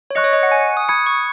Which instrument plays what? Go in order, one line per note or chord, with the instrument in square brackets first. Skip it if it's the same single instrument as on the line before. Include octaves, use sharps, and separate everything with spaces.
[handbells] C#5
[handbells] D#5 [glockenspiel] C#6 F#6 C#7
[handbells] C#5
D#5
F#5
G#5
D#6
[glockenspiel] B5 G#6 C#7 [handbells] D#6
[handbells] C#6